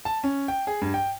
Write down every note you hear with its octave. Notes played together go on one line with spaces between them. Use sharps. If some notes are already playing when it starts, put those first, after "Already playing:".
A5
C#4
G5
G#4
G2
G5